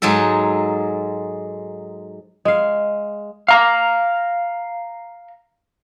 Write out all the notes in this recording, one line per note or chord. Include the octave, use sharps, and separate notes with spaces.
G#2 F#3 G#3 D#4 A4
G#3 F5
F5 A#5